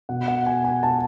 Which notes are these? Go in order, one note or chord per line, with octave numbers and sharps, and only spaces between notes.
B2 F#5
F#5
G#5
G#5
A5